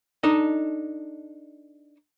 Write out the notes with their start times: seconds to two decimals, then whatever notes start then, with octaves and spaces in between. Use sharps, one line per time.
0.23 D4 D#4 A4 D#5